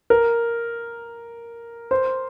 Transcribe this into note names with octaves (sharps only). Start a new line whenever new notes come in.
A#4
C5